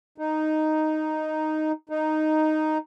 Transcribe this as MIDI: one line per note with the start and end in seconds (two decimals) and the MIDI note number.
0.18 1.72 63
1.89 2.78 63